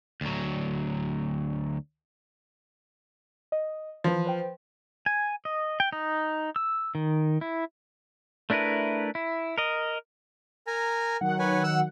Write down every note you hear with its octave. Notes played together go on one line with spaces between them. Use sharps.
D2 F#3
D#5
E3 F3 B4
B4 C5 G5
G#5
D#5
G5
D#4
E6
D#3
E4
A3 D4 E4 A#4 B4
E4
A#4 D#5
A#4 G#5 A#5
D#3 F#3 F#5
B4 C#5 G#5
E6 F#6